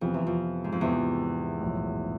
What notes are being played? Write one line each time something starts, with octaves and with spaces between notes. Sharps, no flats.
F2 C3 E3 B3
E2
F2
G#2
F2
E2 C3 E3 B3
B1 A2 F3